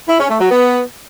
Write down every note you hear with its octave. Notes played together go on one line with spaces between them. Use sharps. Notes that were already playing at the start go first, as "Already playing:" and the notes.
E4
C#4
A3
F#3
B3